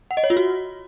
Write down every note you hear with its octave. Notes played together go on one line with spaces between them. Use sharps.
F#5
D#5
C#5
F4
F#4